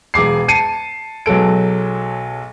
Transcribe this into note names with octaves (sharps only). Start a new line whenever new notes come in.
E1 G#4 D6 C7
A5 C7 C#7 D#7
B1 F#3 G#3 A4 D7